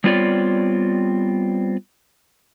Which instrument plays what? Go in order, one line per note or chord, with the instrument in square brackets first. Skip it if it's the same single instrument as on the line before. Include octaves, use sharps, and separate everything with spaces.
[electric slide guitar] G3 B3 C4 F4 C#5 D5